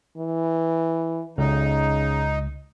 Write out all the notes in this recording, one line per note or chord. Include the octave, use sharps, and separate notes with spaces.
E3
C#2 C#3 D#4